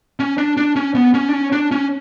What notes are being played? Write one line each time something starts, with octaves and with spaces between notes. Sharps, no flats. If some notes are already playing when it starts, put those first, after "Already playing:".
C#4
D4
D4
C#4
B3
C#4
D4
C#4
D4
C#4